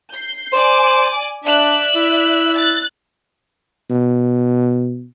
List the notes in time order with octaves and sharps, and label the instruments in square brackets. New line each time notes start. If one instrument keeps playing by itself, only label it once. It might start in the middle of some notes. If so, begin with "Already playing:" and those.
[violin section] G6 C7
[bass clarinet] C5 [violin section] D5 G#5 D6
[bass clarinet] D4 [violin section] D5 E5 F#6
[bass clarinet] E4
[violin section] F#6 A6
[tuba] B2